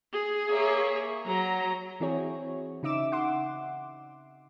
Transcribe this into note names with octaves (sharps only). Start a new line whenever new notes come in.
G#4
A#3 C#5 E5
F#3 A#5
E3 C4 E4 F#4 G#4 C#5
C#3 D#4 E5 D6 E7
F#5 C6 D6